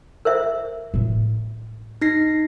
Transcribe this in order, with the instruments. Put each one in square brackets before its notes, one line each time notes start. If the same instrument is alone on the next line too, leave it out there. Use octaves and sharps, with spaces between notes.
[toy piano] A#4 C5 E5
[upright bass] A2 D4
[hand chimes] D#4 A#6 C7